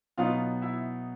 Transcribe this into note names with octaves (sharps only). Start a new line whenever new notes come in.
B2 F#3 B3 D#4 F4 F5
E4 E5